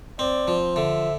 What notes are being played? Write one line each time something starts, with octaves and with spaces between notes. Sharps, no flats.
C4 D5
F3
D3 E5